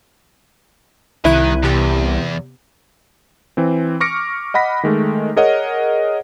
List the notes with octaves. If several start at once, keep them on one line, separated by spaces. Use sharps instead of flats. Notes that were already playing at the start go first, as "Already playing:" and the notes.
C2 D#3 E4 F#6 D#7
E2 C3 B3 G4
E3 C4
C#6 D6 F6 A#6 C#7 D7
D#5 F#5 B5 A#6 B6
D#3 G#3 A3
G#4 A#4 C#5 D#5 F#5